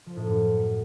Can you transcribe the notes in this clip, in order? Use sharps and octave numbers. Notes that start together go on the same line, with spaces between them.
F3
A2
F#2